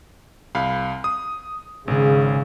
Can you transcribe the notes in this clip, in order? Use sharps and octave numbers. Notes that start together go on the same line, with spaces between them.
C2 F5 B5
D#6
G#1 C#3 G#4